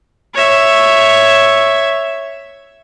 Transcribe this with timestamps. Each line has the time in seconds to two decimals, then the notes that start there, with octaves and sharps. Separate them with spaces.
0.34 C#5 E5